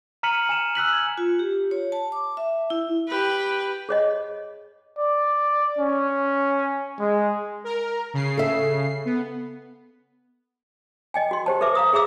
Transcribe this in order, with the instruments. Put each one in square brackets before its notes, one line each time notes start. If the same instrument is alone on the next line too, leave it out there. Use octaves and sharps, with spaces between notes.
[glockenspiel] A#5 F6 B6 C#7 D#7 F#7
G#5 C#7 E7
E6 F#6 B6 F#7
F#6 G#6
[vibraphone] F4
G4
C#5
A5
D6
E5
E4
[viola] G4 B4
[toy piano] G#4 C#5 D#5
[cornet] D5
C#4
G#3
[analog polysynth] A#4
C#3 C7
[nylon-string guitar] A4 E5
[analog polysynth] B3
[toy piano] D#5 G5 G#5
F#4 C6
G4 C5 A5
A4 B4 E5 D6
F5 A#5 D#6
G#4 E5 A#5 D6 E6